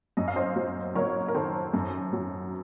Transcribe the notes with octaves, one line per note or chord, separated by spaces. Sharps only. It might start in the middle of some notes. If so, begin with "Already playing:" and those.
F#2 D#5
F5
C5 D#5
F#3
F#1 A#4 C#5
A#4
D#3 A4 C5
F#2
F#3